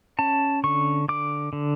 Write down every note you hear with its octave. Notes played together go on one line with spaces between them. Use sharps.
C#4 A5
D3 C#6
D3 D6
D3